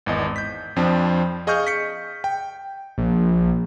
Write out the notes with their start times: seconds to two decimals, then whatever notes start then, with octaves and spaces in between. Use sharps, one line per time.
0.06 G#1 E2 D#5
0.36 G6 B6
0.76 F2 F3 C4 D4
1.47 G#4 D#5 F5 C#6 F6 G6
1.67 B6 C#7
2.24 G5
2.98 A#1